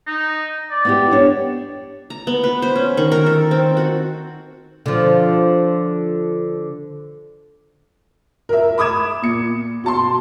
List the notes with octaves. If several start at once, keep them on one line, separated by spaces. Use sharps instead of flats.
D#4
D5
B3 E4 G4
D4 C#5
A#5
B3
B4
C5
C#4
D#3
A#4
A4
C4
F#4
D3 F3
A#4 E5
B5 D6 D#6 G#6 E7
A#2 C#7
B2 A5 C6